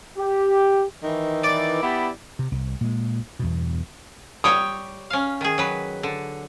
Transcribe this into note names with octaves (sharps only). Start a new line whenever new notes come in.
G4
D#3 E3
D5
B3 E4 G4
C3
C2
A#2 G#3
E2 G2 B2
G3 C#5 G5 D#6
C#4 F5
D#3 G#4
F#3 B4
D3